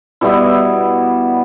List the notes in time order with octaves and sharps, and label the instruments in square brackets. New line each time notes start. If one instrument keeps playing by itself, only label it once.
[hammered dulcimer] B2 G3 B3 E4